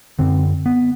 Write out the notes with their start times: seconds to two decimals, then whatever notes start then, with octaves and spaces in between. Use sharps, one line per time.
0.19 F#2 D3 C4
0.66 B3